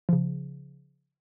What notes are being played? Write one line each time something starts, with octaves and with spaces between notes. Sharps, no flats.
C#3 F3